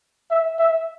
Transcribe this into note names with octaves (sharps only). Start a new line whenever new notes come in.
E5
E5